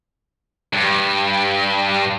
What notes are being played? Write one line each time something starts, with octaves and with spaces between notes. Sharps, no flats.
G2